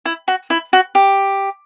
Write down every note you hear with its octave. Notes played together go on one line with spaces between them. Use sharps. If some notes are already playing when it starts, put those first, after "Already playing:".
E4
F#4
E4
F#4
G4